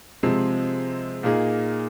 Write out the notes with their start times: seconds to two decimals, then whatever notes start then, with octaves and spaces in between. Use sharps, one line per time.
0.23 C3 F3 G#3 C4
1.23 A#2 A#3 D#4 G#4